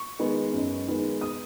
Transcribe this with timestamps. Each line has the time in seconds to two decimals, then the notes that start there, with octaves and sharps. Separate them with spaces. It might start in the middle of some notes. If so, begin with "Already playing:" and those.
Already playing: C#6
0.19 D#3 G#3 B3 D#4
0.53 F#2
0.88 D#3 G#3 B3 D#4
1.21 D#6